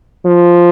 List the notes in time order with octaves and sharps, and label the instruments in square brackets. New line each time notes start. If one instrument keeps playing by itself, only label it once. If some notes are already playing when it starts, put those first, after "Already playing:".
[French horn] F3